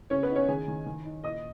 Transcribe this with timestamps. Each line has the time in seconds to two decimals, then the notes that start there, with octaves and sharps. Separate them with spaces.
0.10 C#3 C#4 C#5
0.23 B3 B4
0.30 D#4
0.36 C#4 C#5
0.48 D#3 G#4 G#5
0.68 D#3
0.86 D#3
1.05 D#4
1.24 A#2 D#5 D#6